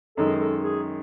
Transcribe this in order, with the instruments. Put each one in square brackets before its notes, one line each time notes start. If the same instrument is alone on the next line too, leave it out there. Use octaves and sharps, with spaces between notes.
[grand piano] F#2 D#3 G#3 D#4 [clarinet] A4
[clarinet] A4
G#4